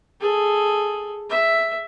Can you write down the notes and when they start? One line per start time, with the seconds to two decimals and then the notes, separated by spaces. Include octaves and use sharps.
0.21 G#4 A4
1.30 E5